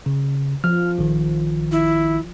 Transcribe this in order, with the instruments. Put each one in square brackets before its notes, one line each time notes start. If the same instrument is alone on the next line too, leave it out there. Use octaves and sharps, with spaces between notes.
[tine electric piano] C#3
[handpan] F3 [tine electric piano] F6
[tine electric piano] A#1 D#3
[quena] E4